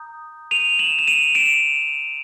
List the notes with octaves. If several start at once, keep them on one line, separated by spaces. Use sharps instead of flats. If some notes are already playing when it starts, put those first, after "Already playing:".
Already playing: A#5 D#6 G6
D#7 F7
E7 F#7
E7
D#7 F7
D7 E7